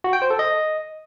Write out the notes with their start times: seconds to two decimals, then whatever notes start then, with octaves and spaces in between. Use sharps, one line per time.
0.04 F#4
0.13 G5
0.22 C5
0.30 A4
0.39 D#5